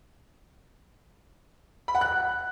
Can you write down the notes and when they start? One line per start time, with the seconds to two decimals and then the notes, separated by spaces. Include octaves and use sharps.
1.88 B5
1.95 F#5
2.01 F#6